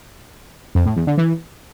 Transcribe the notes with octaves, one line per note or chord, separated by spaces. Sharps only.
F2
A2
E2
D3
E3